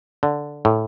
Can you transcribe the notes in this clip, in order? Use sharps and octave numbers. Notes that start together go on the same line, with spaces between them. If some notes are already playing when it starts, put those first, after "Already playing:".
D3
A2